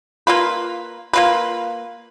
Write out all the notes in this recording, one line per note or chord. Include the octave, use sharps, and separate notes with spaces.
A#3 F4 B4
A#3 F4 B4